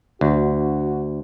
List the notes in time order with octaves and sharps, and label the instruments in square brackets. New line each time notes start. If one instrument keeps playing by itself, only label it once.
[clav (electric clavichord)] D2 [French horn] F#4